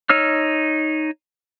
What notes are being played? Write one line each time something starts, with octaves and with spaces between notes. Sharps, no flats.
D#4 C#5 E6 F6